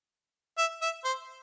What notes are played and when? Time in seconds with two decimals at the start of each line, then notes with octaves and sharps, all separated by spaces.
0.58 E5
0.82 E5
1.05 C5